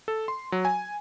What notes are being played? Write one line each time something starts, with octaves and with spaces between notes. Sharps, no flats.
A4
C6
F#3
G#5